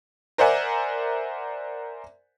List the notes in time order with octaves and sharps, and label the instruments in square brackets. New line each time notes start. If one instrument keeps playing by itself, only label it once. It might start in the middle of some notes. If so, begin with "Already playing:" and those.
[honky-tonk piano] A#4 C5 D5 E5 F#5 G#5